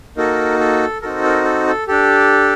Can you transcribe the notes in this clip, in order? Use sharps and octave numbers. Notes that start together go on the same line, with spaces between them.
A#3 D#4 F#4 A4 A#4
A4
C4 D#4 F#4 A4 A#4
A#4
A4
A4
D4 G4 A4